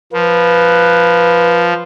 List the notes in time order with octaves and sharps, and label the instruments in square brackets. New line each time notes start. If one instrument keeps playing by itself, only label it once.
[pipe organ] F3 [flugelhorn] B4